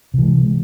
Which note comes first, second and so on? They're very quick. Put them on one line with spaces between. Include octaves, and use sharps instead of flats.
C3 E3 G#3